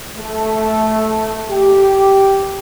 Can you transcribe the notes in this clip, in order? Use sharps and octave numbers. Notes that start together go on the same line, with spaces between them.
A3
G4